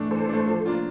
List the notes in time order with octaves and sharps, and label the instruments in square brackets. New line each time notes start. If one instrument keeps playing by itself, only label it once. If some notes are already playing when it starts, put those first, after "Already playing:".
Already playing: [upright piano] E3 A3 D4
[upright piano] E3 [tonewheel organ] A4 C5
[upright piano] A3 D4
F3
A#3 D4 F4